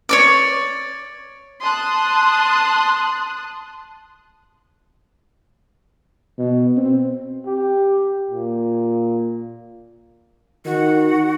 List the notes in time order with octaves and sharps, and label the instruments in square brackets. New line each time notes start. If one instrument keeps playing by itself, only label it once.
[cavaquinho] C#5 D5 D6
[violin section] A5 C6 D#6 F#6
[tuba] B2
C4
[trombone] G4
A#2
[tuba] D#3 [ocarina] D#4 [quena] F#4